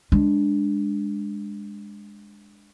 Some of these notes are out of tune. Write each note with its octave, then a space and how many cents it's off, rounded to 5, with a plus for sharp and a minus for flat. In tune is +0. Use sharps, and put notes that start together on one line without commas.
G#3 -15 D4 +0